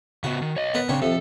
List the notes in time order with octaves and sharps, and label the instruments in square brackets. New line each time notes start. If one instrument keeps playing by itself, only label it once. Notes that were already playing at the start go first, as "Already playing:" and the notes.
[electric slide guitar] C#3 B3 [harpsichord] F#4
[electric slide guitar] D#3
C#5 D#5
[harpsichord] B3 A#4 B4
[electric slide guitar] C#3 [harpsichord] C4 D4 C#5
[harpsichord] F2 C3 [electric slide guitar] A4